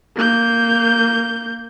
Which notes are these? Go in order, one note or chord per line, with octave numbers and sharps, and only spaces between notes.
A#3 G6